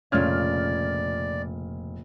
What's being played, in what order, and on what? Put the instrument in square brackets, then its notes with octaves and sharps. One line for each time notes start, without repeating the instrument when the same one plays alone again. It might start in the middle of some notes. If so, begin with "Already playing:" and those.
[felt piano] F1 F6 G#6 [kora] A#2 C#3 [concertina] D5